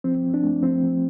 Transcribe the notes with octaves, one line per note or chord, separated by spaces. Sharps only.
F3 C4
F3
D4
A3
F3 C4
F3